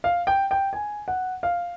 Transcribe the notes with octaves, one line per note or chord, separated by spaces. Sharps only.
F5
G5
G5
G#5
F#5
F5